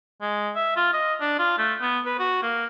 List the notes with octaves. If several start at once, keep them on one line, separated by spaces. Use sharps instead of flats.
G#3
E5
F4
D#5
D4
F4
A3
B3
B4
F#4
A#3